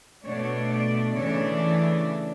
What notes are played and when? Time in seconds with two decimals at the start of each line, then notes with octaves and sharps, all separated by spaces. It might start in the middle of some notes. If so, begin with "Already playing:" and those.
0.24 B2 A3 D4 C#5
0.71 D5
1.15 C#3 E3 A3 D4 C#5
1.60 E4